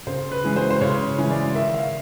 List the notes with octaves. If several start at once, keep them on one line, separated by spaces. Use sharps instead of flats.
C#3 C5
B4
E3 G#3 C#4
C5
C5
C#3 C#5
E3 G#3 C#4
D5
D#3 E5
F5